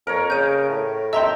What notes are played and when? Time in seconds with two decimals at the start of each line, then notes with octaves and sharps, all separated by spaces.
0.07 F2 A#4 C#5
0.30 C#3 G6 D#7
0.69 A2
1.13 D#5 E5 G5 A#5 C6